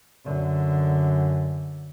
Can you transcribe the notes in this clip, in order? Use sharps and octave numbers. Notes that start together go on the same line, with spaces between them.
F#2 D3